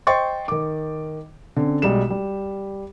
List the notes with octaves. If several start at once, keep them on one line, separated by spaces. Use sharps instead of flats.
C5 D#5 G5 C6 C#6 A6
D#3 D6
D3 C4 C#4
B1 G3 G#3 E7
G3